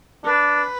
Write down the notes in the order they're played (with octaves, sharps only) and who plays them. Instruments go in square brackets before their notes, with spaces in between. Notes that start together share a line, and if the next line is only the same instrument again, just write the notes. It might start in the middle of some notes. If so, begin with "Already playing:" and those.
[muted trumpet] D4 [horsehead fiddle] B4